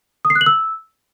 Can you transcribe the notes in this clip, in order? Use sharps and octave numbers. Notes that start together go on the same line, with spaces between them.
D#6
C7
F#6
F#7
E6